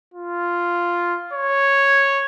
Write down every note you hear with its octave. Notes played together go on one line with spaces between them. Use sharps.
F4
C#5